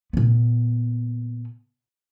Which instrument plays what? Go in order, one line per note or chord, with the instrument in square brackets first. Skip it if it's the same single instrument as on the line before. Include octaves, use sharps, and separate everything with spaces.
[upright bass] A#2 B3